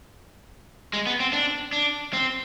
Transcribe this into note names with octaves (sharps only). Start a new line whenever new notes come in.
G#3
B3
C4
D4
D4
C4